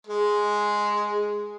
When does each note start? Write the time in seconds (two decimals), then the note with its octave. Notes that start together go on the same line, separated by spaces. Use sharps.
0.07 G#3